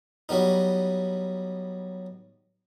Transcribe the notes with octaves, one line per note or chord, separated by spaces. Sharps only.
F#3 G3 B3 D#4